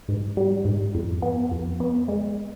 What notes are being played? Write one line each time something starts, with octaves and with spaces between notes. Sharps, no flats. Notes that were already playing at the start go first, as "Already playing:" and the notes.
G#2
G3
G#2
F2
B3
F2
B3
G#3